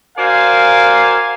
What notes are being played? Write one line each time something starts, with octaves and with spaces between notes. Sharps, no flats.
F#4 A#4 C5 D5 F5 G#5